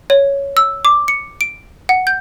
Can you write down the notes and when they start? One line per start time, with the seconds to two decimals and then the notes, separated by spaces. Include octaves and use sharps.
0.10 C#5
0.57 E6
0.85 D6
1.08 C#7
1.41 D7
1.89 F#5
2.07 G6